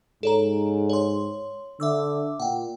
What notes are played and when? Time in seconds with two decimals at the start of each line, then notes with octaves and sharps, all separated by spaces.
0.23 G#2 A4 C#5 A#5
0.89 C#5 C6
1.80 D3 E5 D6 E6
2.40 A#2 F#5 G5